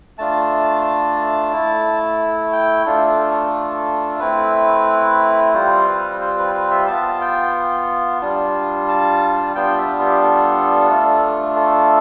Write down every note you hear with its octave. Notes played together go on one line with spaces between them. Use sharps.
A3 D4 F4 A5
A3 E4
G5
A3 D4 F4 A4
A4
A3 C4 E4 B4
G3 C4 F4 C5
B4
C5
B4
B4
E5
B3 F4 A5
G5
G3 D4 F4
A5
G3 B3 D4 F4 G5
E5
G4
A4
A3 D4 F4
A4